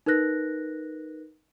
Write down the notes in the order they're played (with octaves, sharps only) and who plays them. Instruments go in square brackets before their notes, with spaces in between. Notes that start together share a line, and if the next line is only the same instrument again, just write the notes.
[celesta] D#4 A#4 B4 F#6 A#6